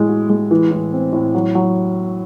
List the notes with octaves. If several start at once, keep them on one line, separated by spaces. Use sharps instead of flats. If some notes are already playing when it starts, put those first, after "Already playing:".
Already playing: A2 G#3
F#4
G#3
E3
A2
C4
A2
F#3
F#3